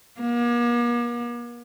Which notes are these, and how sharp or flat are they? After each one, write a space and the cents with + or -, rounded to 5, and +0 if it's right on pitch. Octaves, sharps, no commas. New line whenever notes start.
A#3 +40